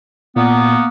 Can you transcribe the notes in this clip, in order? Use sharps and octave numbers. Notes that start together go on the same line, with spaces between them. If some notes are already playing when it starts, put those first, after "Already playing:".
A#2 A#3 B3